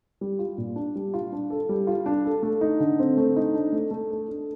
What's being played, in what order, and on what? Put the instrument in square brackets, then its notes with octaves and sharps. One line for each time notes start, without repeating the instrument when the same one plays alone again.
[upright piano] G3
F4
A#2
D4
G3
F4
D4
A4
G3
F4
D4
A4
A3
D#4
D3
C4
A3
D#4
D4
A3
A3
A4
D4